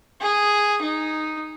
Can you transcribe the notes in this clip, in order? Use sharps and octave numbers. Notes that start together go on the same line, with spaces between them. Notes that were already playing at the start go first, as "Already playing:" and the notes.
G#4
D#4